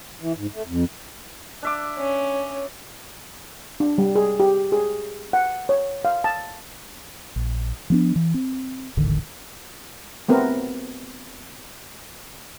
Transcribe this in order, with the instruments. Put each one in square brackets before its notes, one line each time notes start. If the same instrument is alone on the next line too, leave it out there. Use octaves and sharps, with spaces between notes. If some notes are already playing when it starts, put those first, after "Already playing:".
[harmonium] E3
G#2
A3
F2
[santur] D4 E5 D6
[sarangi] C#4
[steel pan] D4
G3
G#4
G4
G#4
F#5
C#5
F5
A5
[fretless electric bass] A#1
F3 B3 D4
E3
C4
D#1 A1 D3 D#3
[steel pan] A3 B3 C4 A#4